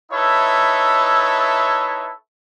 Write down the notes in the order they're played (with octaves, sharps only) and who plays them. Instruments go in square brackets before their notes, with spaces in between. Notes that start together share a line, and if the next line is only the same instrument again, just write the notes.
[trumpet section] D#4 E4 A4 B4 C#5 E5